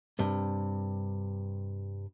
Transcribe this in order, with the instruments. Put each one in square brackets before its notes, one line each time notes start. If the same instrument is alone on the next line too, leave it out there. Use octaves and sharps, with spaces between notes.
[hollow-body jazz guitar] G2 C3